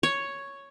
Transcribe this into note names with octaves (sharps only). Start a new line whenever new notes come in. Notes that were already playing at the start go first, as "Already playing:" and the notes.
C#5